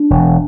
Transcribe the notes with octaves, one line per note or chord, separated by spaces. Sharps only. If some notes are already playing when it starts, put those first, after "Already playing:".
Already playing: D4
E1